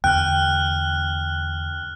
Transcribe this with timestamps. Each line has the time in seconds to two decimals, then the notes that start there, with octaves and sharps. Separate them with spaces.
0.04 E2 D3 G5 F6 F#6